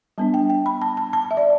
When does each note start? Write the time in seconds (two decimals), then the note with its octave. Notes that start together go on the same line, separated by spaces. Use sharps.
0.18 G3 B3 D4 A5
0.34 G5
0.50 G5
0.66 B5
0.82 A5
0.97 A5
1.13 A5
1.31 E5
1.37 D5